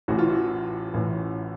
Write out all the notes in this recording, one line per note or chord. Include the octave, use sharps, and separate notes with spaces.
A1 A2 E3 F#4
F4
F#4
A1 A2 E3